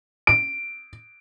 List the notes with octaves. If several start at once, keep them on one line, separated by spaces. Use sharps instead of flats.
D7